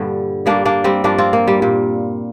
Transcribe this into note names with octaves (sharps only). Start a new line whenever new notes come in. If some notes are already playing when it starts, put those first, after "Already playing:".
Already playing: G2 A#2 D3 G3 D4
G2 G3 A#3 D4
A#3 D4
G3 C4
G2 F3 A#3 D4
C4 F4
A#3
G3
A#2 G3